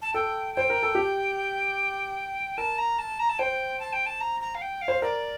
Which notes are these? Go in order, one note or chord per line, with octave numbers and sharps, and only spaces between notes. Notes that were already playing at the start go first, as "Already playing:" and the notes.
A5
A4 G5
C5 G5
A#4
A4
G4
A#4 A5
A#5
A5
A#5
A5
C5 G5
A5
G5
A5
A#5
A#5
F5
G5
F5
C5
A#4 D5